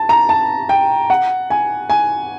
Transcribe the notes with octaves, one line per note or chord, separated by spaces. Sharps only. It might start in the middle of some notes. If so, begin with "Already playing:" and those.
Already playing: A5
A#5
A5
G5
F#5
G#5
G#5